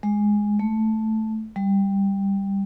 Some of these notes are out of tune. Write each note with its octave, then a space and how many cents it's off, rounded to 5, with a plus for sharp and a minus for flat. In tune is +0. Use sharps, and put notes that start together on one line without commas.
G#3 +0
A3 -5
G3 +10